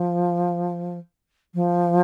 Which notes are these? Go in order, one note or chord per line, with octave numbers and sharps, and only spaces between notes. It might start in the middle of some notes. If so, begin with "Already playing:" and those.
Already playing: F3
F3